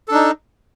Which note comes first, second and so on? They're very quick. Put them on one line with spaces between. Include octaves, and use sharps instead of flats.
A4 D4 D#4